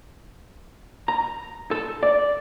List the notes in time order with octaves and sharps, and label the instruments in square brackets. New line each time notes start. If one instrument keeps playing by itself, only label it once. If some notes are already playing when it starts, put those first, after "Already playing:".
[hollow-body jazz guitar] A#5
A4
D5